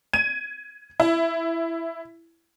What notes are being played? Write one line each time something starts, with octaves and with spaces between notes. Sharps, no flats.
G#6 D#7
E4